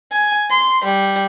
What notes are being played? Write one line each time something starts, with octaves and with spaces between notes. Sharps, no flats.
G#5
C6
G3